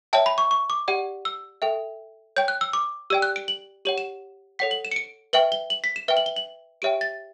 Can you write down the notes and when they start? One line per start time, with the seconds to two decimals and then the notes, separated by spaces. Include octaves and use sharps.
0.13 C#5 E5 G5 A5
0.26 B5
0.38 C#6
0.51 C#6
0.70 D6
0.88 G4 D5 F#5
1.25 E6
1.62 A4 E5 G5
2.37 C#5 G5 G6
2.48 F#6
2.61 E6
2.73 D6
3.10 G4 D5 G5 E6
3.22 F#6
3.36 D7
3.48 F#7
3.85 G4 C#5 F#5 F#7
3.98 E7
4.59 A4 C#5 F#5 B6
4.71 F#7
4.85 E7
4.91 C#7
4.96 D7
5.33 B4 E5 G5 F#7
5.52 G7
5.70 F#7
5.84 B6
5.96 E7
6.08 B4 E5 G5 G7
6.17 F#7
6.26 G7
6.36 F#7
6.82 G4 C#5 E5 G5 D7
7.01 A6